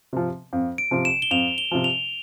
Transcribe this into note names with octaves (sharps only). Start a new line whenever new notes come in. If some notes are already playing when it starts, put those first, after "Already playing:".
C3 F3
F2
D7
C3 F3
E7
G7
F2 F7
G7
C3 F3
F7